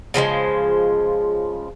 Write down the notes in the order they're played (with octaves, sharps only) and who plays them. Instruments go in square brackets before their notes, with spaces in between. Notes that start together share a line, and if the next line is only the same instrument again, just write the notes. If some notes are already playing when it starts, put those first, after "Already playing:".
[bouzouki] C#3 F3 F#3 G#3